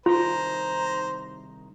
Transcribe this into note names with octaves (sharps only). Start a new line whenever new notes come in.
C2 D#3 F4 C5 A#5 C6